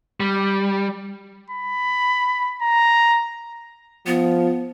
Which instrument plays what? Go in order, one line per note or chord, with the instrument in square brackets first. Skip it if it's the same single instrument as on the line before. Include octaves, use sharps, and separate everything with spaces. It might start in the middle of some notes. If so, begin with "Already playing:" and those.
[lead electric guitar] G3
[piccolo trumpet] B5
A#5
[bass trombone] F3 [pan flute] B3